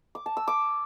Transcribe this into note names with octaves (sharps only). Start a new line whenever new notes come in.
D6
A5
E6
D6